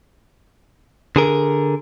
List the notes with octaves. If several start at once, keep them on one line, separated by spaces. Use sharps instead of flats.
D3 G#4 A#4